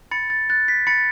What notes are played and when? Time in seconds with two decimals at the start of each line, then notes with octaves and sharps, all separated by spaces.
0.11 B5 A6 C#7
0.30 A6
0.50 F#6 A6
0.68 B6
0.87 B5 A6 C#7